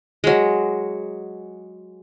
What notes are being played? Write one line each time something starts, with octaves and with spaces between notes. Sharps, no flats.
F#3 G#3